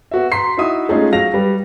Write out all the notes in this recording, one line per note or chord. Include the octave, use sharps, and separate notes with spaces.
B3 F#4 E5
A#5 C6 B6 C7
D#4 E4 F#4 E5 D#6
G#3 A3 C#4 D#4 F4 G#4
F#3 F5 A#6 F7
G3 B4